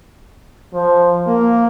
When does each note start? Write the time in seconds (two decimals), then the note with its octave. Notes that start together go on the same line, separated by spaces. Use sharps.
0.74 F3
1.27 A#3